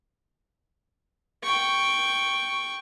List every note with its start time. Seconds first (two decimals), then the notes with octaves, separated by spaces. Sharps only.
1.43 G5 C#6